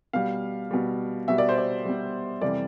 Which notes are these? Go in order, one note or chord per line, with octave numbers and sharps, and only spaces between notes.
B2 G3 F5
B2 G3
B2 G3 E5
D5
C5
D5
B2 G3
F2 C3 E3 G3 D5